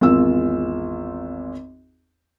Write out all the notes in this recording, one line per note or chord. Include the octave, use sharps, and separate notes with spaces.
G#1 E2 F4 E6